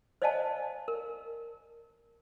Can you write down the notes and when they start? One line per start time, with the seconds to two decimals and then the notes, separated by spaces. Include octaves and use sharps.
0.22 C5 D5 D#5 F5 G#5 A5
0.88 A#4